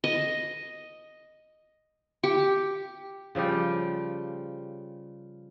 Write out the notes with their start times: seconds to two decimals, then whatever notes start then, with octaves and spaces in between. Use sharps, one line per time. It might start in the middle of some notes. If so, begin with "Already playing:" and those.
0.04 D#5
2.23 G4
3.35 C#3 F3 G3 G4